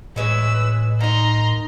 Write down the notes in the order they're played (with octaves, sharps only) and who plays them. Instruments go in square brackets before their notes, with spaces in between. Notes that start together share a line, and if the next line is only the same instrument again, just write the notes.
[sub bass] A2 [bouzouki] E3 G#3 C#4 [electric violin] B4 E6
[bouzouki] D#3 D#4 [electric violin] A#5 C6